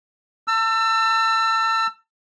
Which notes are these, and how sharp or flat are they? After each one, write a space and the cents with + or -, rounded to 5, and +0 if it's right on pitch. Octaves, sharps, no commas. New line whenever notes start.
A5 +35 E6 +25